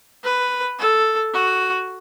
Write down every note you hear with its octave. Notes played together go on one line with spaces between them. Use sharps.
B4
A4
F#4